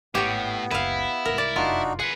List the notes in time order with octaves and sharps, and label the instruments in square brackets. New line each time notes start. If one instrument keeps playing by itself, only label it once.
[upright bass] G#1 [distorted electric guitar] A2 [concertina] B3 [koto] G4 C#5
[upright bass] F#1 C#2 [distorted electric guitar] E4 [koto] B4 F5
[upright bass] C2 G#2 [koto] A#4
[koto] D5
[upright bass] F1 F#2 [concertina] D4 D#4 F#4 [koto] F4
[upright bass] E3 [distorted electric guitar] G#4 B4 [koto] F#5